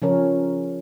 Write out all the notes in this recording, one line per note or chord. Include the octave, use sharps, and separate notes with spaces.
C#3 F3 C#4 A#4